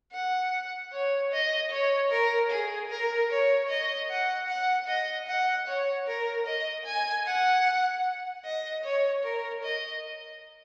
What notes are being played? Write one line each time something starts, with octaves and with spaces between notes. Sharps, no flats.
F#5
C#5
D#5
C#5
A#4
G#4
A#4
C#5
D#5
F#5
F#5
D#5
F#5
C#5
A#4
D#5
G#5
F#5
D#5
C#5
A#4
D#5